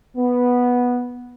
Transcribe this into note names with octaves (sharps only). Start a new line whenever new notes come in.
B3